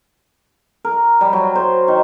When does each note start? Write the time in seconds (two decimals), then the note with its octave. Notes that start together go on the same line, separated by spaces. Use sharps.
0.85 A#4
1.21 G3
1.33 F#3
1.55 C5
1.88 D#3